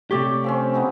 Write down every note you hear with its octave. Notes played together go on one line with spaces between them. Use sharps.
C3 A3 G4 C#5 D5 G5
F3 C4 C#4
B3 D#4 E4